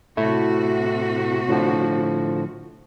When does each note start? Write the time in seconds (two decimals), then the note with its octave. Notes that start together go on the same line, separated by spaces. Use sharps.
0.17 A2 C3 A3 E4 F#4
1.48 A2 D3 F3